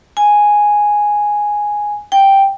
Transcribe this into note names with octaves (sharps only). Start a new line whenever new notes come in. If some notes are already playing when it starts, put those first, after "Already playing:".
G#5
G5